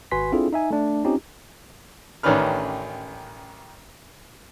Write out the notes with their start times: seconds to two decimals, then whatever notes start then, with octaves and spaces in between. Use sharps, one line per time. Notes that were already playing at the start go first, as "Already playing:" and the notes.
0.11 G#1 F#4 B4 G#5 C6 B6
0.32 C4 D4 E4 F4 G#4 A4
0.53 D#4 E5 G#5
0.71 A3 D4
1.05 C4 C#4 D#4 F4 G4
2.23 A1 D#3 C#4 D4 B4 F6